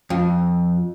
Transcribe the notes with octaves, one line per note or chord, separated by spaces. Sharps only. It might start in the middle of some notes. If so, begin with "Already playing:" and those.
F2